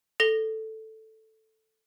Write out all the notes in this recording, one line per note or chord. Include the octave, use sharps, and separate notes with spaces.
A4 A#6 G7